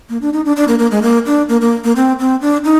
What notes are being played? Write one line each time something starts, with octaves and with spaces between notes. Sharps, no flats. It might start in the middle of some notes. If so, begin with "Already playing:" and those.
A#3
D4
D#4
D4
D4
A#3
A#3
G#3
A#3
D4
A#3
A#3
A#3
C4
C4
D4
D#4